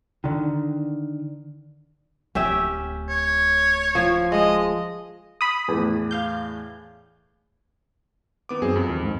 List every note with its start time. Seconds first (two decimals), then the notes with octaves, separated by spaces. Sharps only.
0.24 D3 D#3
2.35 D1 D2 C#4 G4 E5
3.09 C#5
3.95 F3
4.32 G#3 D#5
5.41 B5 D#6
5.68 E2 A2
6.11 F5 G6
8.49 D#3 B3 D6
8.62 F#2 C4 G#4
8.76 F2
8.89 D#2
9.04 G#2